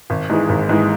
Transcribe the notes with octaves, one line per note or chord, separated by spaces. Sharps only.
G#1
G#2 E3 G#3
G#1
G#2 E3 G#3